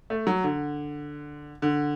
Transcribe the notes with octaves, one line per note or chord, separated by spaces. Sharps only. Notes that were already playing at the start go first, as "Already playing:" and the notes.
A3
F#3
D3
D3